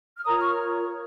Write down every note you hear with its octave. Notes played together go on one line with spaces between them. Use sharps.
F6
F4 A#4 C#5 A#5 D#6
C#6 F6